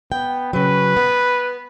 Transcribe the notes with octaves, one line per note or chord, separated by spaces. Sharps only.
B3 G5
C#3 F#3 B4
B3